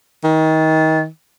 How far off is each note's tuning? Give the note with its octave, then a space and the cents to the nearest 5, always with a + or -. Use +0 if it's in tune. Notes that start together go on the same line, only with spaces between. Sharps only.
D#3 +30